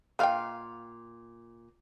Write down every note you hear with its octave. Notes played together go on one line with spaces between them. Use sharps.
A#2 B4 D#5 F5 G5